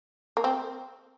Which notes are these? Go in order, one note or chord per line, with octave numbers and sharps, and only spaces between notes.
A#3
C4